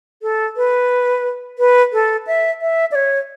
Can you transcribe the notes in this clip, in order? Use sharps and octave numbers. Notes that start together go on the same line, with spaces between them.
A4
B4
B4
A4
E5
E5
D5
C#5